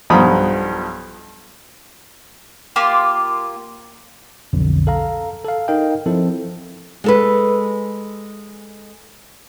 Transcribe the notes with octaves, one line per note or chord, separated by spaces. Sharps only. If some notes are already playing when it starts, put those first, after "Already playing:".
B1 G2 F3 A#5 B5 D#6
A#3 F4 G4 C6
B1 F2 D3
A4 F5 A#5
A4 F5
D#4 A#4 D#5 F5 G5
F3 C4 E4 A4
G#3 A4 B4